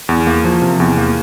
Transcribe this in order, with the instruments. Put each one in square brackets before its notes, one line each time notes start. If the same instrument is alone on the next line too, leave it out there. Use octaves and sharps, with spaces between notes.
[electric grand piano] E2
A#3
F3
C3
E2
A#3